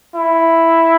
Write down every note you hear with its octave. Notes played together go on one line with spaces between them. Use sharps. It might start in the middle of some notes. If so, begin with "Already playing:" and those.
E4